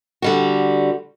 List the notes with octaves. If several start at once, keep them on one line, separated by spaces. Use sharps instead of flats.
D3 G3 F#4